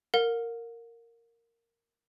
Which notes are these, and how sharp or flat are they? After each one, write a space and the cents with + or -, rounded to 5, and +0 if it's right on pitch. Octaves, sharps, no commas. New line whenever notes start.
A#4 -10 F#5 -45